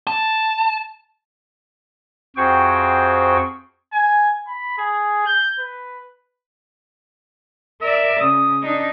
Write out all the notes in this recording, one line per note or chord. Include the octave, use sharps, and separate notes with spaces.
A5
F2 F#4 G#4 C5 G5 C#6
G#5
B5
G#4
G6
B4
A#4 D5 E5
C#3 D#6
D4 D#4